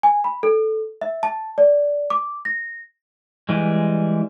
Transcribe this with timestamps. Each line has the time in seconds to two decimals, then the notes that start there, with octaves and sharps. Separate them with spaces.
0.03 G#5
0.24 B5
0.43 A4
1.01 E5
1.23 A5
1.58 D5
2.10 D6
2.45 A#6
3.49 E3 G3 G#3